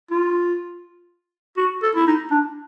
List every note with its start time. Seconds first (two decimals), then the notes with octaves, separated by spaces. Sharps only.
0.11 F4
1.57 F#4
1.83 A4
1.95 E4
2.07 D#4
2.31 D4